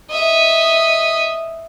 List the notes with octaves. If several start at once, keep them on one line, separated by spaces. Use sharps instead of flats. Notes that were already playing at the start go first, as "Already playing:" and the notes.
D#5 E5